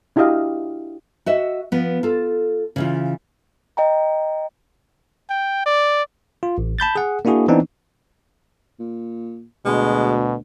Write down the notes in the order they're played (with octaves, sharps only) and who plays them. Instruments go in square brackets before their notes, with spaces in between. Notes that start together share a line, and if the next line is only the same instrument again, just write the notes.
[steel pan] D4 E4 F#4 G4 D#5 F5
[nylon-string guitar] F#4 D#5 E5
F3 B3
F4 A4
C#3 E3 F4
[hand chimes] D#5 G5 A#5
[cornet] G5
D5
[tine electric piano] F4
A1
A5 B5 G6 A6
G#4 F#5
A#3 D4 E4 F#4 G#4
E3 B3 C4 D4 D#4
[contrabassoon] A#2
[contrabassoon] D2 [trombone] B2 [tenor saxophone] G#3